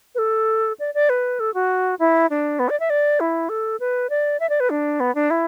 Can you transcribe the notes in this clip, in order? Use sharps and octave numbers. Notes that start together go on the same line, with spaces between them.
B4
A4
D5
D5
B4
A4
F#4
E4
D4
B3
D5
E5
D5
E4
A4
B4
D5
E5
D5
B4
D4
B3
D4
E4